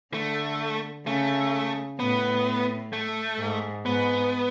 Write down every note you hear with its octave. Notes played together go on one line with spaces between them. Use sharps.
D3 A3
C#3 A3
A2 B3
A3
G#2
G#2 B3